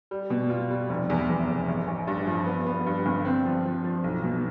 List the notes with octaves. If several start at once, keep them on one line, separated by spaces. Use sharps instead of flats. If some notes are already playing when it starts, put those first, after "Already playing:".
G3
B2
F4
G3
F1
E2
E2
F1
A1
A1
G2
F3
B3
B3
G2
G1
C4
F3
F3
F3
B1
B2